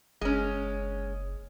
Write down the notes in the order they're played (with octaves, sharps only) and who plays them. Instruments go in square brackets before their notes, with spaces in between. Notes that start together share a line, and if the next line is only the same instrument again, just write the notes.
[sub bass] F#1 [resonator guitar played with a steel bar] G#3 C#4